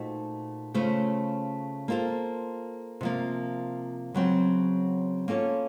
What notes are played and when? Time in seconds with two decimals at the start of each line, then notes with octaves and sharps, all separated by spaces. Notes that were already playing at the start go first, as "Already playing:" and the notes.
Already playing: A#2 A3 D#4 F#4 C5
0.74 C#3 A3 C#4 F4 C5
1.88 A#3 F4 A4 C5
3.01 C3 F3 A#3
4.15 C#3 F#3 C4
5.28 A#3 C#4 F4 A4 C#5